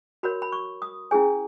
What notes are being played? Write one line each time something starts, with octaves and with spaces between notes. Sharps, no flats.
F#4 A#4 C#5 B5
B5
C#6
D#6
C#4 E4 G#4 C#5 G#5